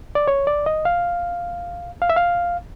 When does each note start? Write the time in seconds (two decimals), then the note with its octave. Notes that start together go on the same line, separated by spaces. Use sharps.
0.15 D5
0.28 C#5
0.47 D5
0.66 D#5
0.85 F5
2.02 F5
2.10 E5
2.16 F5